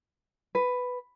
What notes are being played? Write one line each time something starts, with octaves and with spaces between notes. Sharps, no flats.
B4